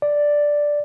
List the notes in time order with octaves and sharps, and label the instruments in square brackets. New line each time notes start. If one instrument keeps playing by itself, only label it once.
[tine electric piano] D5